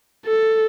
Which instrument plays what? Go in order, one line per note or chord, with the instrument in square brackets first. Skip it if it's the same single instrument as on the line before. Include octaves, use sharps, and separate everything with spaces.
[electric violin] A4